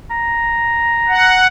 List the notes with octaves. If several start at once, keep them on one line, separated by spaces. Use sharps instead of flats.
A#5
F#5